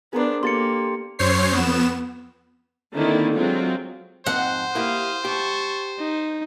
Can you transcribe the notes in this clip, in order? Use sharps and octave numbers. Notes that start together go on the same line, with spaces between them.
B3 D4 G#4 A#4 C5
A#3 G4 A4 G#5 C6 A6 C#7
F#2 C5 C#5 C7
F2 B3 E7
D3 D#3 A#3 C4 E4
F#3 G#3 C4 F4
F2 G#2 C4 C5 F#5
A#3 E4 G4 F5 D#6
G4 A5 C#6
D#4